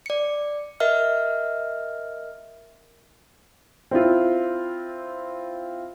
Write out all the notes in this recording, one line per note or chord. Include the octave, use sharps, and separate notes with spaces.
D5 C#7
A#4 D#5 E5 F6
C4 E4 F4